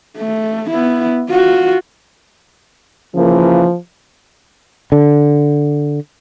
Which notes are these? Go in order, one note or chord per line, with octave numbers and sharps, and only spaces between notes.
A3
B3 E4
F4 F#4
C#3 E3 F3 A#3
D3